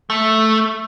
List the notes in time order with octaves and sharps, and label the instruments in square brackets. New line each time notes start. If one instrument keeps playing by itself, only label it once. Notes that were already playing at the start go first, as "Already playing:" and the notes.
[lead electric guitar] A3